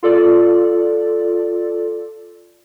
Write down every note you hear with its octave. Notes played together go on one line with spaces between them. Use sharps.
F4 A4 D5